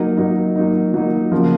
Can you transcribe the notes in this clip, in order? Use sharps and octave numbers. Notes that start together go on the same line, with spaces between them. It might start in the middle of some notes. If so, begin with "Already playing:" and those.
Already playing: F#3 A#3 D#4
F#3 A#3 D#4
F#3 A#3 D#4
F#3 A#3 D#4
C#3 F3 A#3